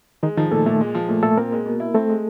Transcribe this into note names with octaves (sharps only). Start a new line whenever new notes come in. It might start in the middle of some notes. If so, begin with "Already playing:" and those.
D#3 G#3 D#4
D#3 F3 D#4
A#2 A3 A4
A#2 A3 A4
G#3
F3
A#2 A3 A4
A#2 A3 A4
A#3 C4 A#4
G#3
B2
E4
A3 C4 A4
G#3